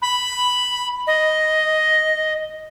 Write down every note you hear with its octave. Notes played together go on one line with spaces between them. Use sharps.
B5
D#5